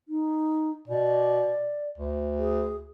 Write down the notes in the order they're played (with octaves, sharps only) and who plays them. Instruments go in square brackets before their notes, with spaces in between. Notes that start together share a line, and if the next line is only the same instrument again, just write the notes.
[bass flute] D#4
[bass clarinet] B2 [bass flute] D5
[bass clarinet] D2
[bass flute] G#4